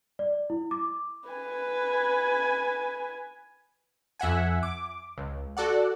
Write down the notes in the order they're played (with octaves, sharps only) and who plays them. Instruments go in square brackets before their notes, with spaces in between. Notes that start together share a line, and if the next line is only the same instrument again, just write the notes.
[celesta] D5
E4
D6
[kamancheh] B4 G#5
[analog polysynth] F2 E5 F#5 G#5
D6
C#2
F#4 A4 D5 F#5